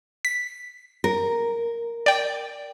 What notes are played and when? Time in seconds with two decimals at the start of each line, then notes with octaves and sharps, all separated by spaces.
0.25 B6
1.04 A#4
2.06 D5 G5